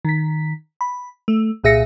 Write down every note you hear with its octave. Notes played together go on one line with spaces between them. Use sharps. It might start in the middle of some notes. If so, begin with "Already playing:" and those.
D#3 B6
B5
A3
C2 A#2 G#4 E5 A#6 C#7